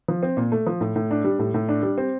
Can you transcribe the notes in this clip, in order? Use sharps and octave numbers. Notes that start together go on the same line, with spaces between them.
F3
C4
A#2
A3
F3
A2
A2
D4
G3
A2
A2
D4
G3
C4